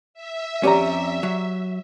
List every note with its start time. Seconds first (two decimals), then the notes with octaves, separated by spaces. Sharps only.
0.14 E5
0.63 F2 C#4 G4 D5 A#5
1.23 F#3